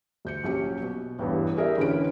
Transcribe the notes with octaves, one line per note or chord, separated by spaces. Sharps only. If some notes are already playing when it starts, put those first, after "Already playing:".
D2 G6 C#7
A#1 F#3 C#4 G4 C#7
B2
A1 E2 G2
G4 G#4 A#4 D5 E5
A1 D3 C#4 B4 D7